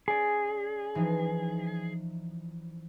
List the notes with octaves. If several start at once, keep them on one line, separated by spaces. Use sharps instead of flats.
C#4 G#4 D5 B6
E3 F3 D#4